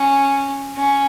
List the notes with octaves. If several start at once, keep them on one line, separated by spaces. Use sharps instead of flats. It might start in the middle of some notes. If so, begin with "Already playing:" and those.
Already playing: C#4
C#4